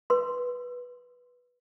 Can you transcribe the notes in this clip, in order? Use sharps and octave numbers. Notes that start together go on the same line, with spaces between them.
B4 C6